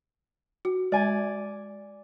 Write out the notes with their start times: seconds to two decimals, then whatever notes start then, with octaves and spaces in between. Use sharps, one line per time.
0.65 F#4
0.92 G#3 D5 G#5